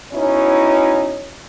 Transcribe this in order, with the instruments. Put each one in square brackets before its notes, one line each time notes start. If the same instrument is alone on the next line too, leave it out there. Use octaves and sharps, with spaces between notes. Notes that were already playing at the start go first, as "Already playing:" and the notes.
[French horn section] B3 C#4 D#4 E4 F#4 C#5